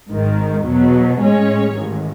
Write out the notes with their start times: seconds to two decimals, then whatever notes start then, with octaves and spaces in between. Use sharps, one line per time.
0.12 G#1 G#2 D#3
0.66 E2 B2 F#3
1.19 A2 G#3 C#4 G#4 C#5
1.73 A1 G#2 D#3